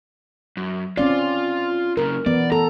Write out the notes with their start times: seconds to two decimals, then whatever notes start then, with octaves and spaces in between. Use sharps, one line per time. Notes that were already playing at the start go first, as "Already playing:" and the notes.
0.57 F#2
0.97 C4 C#4 F4 D5 F5
1.97 F#2 C#3 A#4
2.26 E3 B3 D5
2.52 A4 A#5